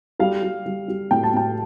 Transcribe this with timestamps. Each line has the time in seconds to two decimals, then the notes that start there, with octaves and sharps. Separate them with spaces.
0.19 G3 F5
0.43 G3
0.66 G3
0.88 G3
1.11 A2 G5
1.23 A5
1.34 A2 G5